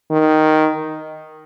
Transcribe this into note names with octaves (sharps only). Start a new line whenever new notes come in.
D#3